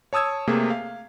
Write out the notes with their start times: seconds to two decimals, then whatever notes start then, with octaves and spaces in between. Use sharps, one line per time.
0.13 C#5 A5 D#6 E6 G#6
0.47 C3 A3 A#3 G#4
0.70 F5